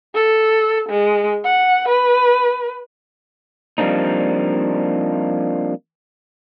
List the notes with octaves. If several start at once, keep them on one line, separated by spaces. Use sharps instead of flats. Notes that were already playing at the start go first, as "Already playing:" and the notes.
A4
G#3
F#5
B4
F3 G3 A#3 C4 D4 D#4